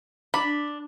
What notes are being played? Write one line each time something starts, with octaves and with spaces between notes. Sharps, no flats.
D4 B5